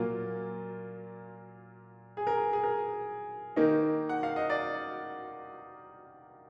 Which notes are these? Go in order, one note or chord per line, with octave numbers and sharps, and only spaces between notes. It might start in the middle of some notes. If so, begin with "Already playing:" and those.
Already playing: A#2 F#3 A#3 F4
G#4
A#4
G#4
G#4
A#4
D#3 A#3 D#4
F#5
F5
D#5
D5